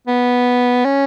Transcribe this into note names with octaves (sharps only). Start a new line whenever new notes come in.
B3
C#4